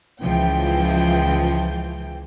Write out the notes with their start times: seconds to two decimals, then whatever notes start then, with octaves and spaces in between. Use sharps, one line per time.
0.22 C#2 E3 F3 G5